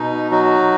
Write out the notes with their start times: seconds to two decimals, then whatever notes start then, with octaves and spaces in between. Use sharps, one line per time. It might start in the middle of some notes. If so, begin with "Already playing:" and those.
Already playing: B2 D#4
0.31 F#3 D#4 F#4